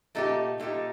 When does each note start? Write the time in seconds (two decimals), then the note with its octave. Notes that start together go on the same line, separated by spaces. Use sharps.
0.15 A#2 A3 D#4 G4
0.60 A#2 A3 D#4 G4